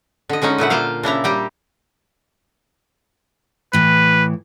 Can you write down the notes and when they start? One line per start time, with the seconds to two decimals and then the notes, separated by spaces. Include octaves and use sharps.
0.29 D3 D#5
0.42 D3 G#3 C#4 D#4
0.58 A#2 D3 E4 F#5
0.70 A#3 F4 C5 F5
1.03 C#3 D4 E4 A#5
1.24 G3 G4 A#5
3.73 A2 E3 B4